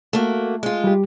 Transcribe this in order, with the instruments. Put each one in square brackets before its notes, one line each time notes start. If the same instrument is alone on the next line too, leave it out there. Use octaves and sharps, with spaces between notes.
[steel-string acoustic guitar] A3 A#3 F#4
G#3 F4
[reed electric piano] G3 G4